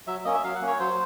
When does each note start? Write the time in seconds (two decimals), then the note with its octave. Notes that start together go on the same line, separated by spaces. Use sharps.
0.07 F#3 E5
0.24 A#3 C#4 D#5
0.34 E5
0.43 F#3 F5
0.55 F#5
0.61 A#3 C#4
0.67 C#5
0.79 F#3 C5